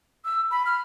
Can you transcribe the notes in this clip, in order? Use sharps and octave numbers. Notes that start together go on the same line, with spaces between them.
E6
B5
F6